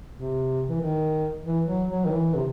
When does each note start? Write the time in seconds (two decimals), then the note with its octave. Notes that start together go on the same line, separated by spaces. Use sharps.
0.15 C3
0.69 E3
0.81 D#3
1.46 E3
1.68 F#3
1.90 F#3
2.05 D#3
2.11 E3
2.36 C3